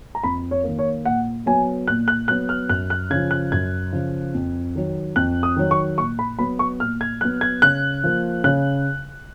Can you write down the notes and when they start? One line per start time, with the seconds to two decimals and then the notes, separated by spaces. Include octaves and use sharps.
0.15 A#5
0.24 F2 B5
0.51 C#5
0.64 D#3 A#3
0.79 C#5
1.05 A#2 F#5
1.46 F#3 B3 G#5
1.88 A#2 F#6
2.08 F#6
2.28 F#3 B3 F#6
2.49 F6
2.69 F#2 F#6
2.90 F#6
3.10 C#3 G#6
3.15 F3
3.31 F#6
3.52 F#2 G#6
3.93 C#3 F3
4.34 F2
4.75 D#3 F#3
5.16 F2 F#6
5.43 D#6
5.56 D#3 F#3
5.71 C#6
5.98 A#2 C#6
6.19 B5
6.39 F#3 B3 B5
6.59 C#6
6.80 A#2 F6
7.01 G#6
7.21 F#3 B3 F#6
7.41 G#6
7.62 C#3 F#6
8.04 F3 A#3
8.44 C#3 F#6